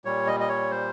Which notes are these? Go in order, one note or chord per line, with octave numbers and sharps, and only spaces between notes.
A#2 G3 C#5
D#5
D#5
C#5
C5